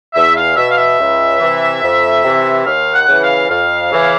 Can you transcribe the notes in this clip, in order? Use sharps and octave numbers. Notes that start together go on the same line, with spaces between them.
E2 E5
F5
B2 E5
F5
E5
C#2
C3 E3
F2
C3 E3
D#2 F5
F#5
C#3 E3
F5
F2 F5
C#3 E3